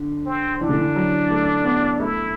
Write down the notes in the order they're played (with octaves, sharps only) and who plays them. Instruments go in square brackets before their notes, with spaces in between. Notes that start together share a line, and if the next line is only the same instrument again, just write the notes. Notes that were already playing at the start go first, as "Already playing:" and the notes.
Already playing: [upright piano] D3
[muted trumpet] C4
[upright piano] E3 [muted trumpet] D4
[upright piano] D3
E3
F#3
A3
B3
[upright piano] A3 [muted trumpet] E4